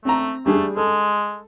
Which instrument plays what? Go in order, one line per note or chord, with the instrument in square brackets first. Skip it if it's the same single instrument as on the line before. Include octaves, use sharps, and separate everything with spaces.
[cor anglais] A3 [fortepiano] C4 A#5
[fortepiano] G3 D4 G#4 [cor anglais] A3
[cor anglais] G#3 [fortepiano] A4